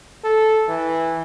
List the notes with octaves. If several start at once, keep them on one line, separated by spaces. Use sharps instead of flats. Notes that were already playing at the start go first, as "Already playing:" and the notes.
A4
E3